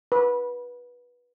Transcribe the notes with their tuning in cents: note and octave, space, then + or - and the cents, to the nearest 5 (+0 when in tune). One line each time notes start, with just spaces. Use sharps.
B4 -15